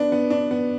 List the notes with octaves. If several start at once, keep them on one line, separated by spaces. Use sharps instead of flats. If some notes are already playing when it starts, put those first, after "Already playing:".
Already playing: B3 D4
B3
D4
B3